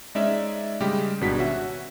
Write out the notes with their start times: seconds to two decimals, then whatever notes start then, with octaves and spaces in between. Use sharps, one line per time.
0.15 G#3 C#4 D#4 D5 E5
0.81 C#3 G3 G#3 G4
1.21 G#1 B2 D4 F#4 B6
1.39 C#4 F#4 E5 F#5